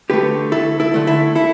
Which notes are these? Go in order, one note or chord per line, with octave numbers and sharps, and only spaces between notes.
D3 A3 G4 B4
D2 E4 A4
E4 A4
D3 A3
E4 A4
E4 A4